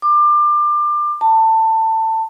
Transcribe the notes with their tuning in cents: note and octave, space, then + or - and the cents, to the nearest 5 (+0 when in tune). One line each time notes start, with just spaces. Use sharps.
D6 +25
A5 +20